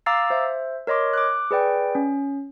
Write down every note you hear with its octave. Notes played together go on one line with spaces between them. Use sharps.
F5 A#5 D6 E6 A6 C7
C5 E5
A#4 C#5 D#5 C6 D6
D6 F#6
G#4 B4 D5 G5
C#4